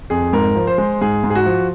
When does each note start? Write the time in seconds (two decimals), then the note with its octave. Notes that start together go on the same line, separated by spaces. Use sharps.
0.10 F2 G#4
0.33 G#2 A#4
0.56 F3
0.67 C5
0.78 G#3
1.01 G#2 G#4
1.24 G#2
1.30 G#4
1.35 F#4
1.46 F3